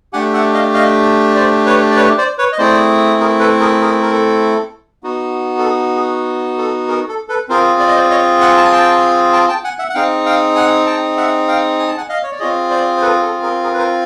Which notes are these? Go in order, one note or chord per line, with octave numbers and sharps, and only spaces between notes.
A3 D4 G4 F#5 G#5
E5 F#5
D#5 F5
D#5 F5
C5 D5
B4 C#5
D5
B4 C#5
C5 D5
B4 C#5
D#5
A3 C4 E4 G#4 C5 D5
G#4 A#4
A4 B4
G#4 A#4
G#4 A#4
A#4
A4
B3 D#4 F#4
A4
G#4
G#4
A4
G#4 A#4
A4
A4 B4
C4 F4 G#4 A#4 C5
D5
D#5
C5 D5
C#5 D#5
F#5 G#5
A5
G#5
G5 A5
G5 A5
G5 A5
F#5 G#5
E5 F#5
F#5
C4 D#4 G#4 F5 G5
F5 G5
F#5 G#5
G5 A5
E5 F#5
F5 G5
G#5
A5
F#5 G#5
D#5 F5
C#5
D5
C4 F4 G#4 C#5 D#5
C5 D5
C5
A4 B4
A4
G#4 A#4
G#4 A#4
B4
A#4 C5